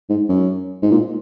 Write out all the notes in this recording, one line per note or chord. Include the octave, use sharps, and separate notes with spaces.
G#2
F#2
G#2
A#2